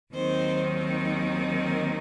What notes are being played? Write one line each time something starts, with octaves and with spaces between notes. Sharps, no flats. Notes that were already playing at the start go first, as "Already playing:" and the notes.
D#2 D#3 F#3 C4 D#4 C5
A#4